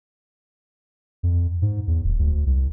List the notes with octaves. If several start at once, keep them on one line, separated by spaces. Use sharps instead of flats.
F2
G#2
E2
D1
D2
C2